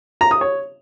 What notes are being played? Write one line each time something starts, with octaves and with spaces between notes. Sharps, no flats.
A#5
D#6
C#5